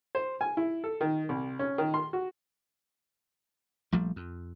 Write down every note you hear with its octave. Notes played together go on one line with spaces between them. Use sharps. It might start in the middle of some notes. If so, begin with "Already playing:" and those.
C5
G#5
E4
A4
D#3
C2
C#4
D#3
C6
F#4
A#1 F3 G3 A3
F2